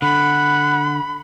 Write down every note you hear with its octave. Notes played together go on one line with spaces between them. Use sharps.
D3 F#5 B5